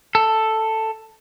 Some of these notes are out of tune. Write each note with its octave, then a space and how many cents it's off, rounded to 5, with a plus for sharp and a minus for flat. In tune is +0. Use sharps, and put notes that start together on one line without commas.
A4 +5